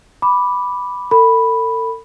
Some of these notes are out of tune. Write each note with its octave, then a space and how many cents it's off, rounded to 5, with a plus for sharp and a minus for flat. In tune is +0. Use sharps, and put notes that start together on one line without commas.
B5 +0 D6 +0
A4 +40 B5 +0